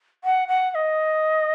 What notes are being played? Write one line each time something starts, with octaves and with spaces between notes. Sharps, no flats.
F#5
F#5
F#5
D#5